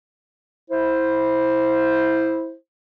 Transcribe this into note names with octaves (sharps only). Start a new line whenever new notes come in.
E4 C5